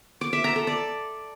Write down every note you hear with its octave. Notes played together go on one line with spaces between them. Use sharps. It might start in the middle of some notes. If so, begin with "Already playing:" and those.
D6
E5
A#5
A4
D5